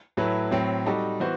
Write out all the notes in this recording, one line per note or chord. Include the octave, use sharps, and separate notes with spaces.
A2 F#3 A3 E4 B4
A2 F#3 C4
G3 D#4 F#4 A4
E3 B3 F#4 C5